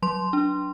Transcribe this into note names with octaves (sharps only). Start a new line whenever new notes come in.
F#3 C6
D4